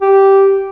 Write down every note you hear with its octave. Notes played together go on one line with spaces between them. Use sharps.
G4